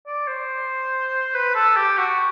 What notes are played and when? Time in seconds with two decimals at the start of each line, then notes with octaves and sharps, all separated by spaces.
0.06 D5
0.27 C5
1.34 B4
1.55 A4
1.76 G4
1.97 F#4